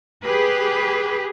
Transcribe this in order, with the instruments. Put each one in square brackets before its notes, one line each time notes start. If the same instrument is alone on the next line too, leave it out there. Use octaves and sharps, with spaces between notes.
[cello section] G4 G#4 B4